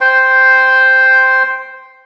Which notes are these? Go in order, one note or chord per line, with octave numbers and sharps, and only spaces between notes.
C5 G5 C6